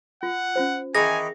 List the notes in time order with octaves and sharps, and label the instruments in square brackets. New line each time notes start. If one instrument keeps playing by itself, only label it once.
[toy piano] F4 [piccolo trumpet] F#5
[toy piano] C#4 F4 C5
[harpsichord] D#3 E3 D#4 [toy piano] G#4 E5 [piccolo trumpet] G#5 [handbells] A#6